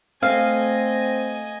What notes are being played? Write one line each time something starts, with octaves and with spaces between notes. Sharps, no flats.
A3 C4 D#5 F5 G#5